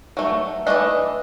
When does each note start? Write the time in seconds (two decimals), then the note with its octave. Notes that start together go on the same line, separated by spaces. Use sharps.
0.17 F#3 A3
0.67 E3 A3 D4 D#5